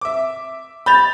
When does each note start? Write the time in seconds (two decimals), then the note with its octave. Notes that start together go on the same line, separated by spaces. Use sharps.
0.01 E5 D6
0.86 B5 G6 A6 F7